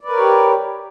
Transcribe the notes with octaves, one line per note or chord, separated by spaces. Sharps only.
G4 A#4 B4 C#5 D5